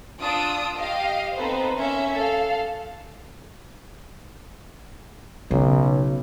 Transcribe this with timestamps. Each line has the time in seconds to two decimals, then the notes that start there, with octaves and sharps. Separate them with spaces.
0.20 D4 F4 D#6 E6 D7
0.76 G4 D#5 F5
1.36 B3 C4 D#4 A4 B4 C5
1.79 A#3 C#4 E5
2.16 A4 F5
5.51 B1 C#3